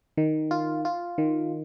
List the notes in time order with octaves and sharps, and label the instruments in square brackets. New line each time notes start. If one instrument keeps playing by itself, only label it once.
[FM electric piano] D#3
F4
F4
D#3